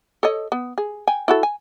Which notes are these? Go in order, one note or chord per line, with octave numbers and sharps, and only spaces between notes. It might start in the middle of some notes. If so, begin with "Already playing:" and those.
A4 C#5 D#5
B3
G#4
G5 G#5
E4 F#4 A4
G#5